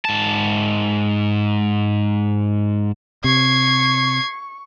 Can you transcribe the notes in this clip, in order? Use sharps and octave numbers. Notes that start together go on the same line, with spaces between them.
G#2 A5
C3 C#6 G#6 C7